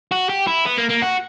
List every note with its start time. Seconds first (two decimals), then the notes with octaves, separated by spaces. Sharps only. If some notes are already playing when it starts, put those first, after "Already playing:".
0.12 F#4
0.30 G4
0.47 E4
0.66 B3
0.78 A#3
0.90 A#3
1.02 F#4